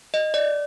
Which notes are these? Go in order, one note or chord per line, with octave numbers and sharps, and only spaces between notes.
D#5
D5